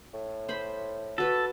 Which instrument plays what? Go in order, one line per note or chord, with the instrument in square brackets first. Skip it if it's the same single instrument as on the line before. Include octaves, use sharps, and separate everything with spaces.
[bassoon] A2
[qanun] C5 B5
[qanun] F#4 B4 [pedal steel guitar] A4